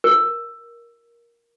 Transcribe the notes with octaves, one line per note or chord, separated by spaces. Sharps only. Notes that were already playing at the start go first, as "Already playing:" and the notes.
A#4